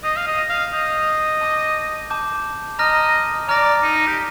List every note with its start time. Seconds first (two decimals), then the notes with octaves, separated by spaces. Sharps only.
0.03 D#5 D#6 G6 C7 F7
0.16 F5
0.27 D#5
0.49 F5
0.73 D#5 D#6 G6 C7 F7
1.41 A5 D6 G6
2.10 A5 D6 G6
2.79 D#5 A#5 F6 A#6
3.49 D5 A#5 F6 A#6
3.83 D#4
4.07 G4